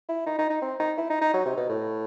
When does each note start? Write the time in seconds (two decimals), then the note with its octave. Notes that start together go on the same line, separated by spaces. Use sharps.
0.09 E4
0.26 D#4
0.38 D#4
0.50 D#4
0.62 C4
0.80 D#4
0.98 E4
1.10 D#4
1.21 D#4
1.34 F#3
1.45 C3
1.57 B2
1.69 A2